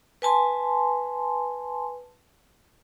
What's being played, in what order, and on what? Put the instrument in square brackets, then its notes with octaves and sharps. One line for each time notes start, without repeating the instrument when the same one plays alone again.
[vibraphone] B4 G#5 A5 C6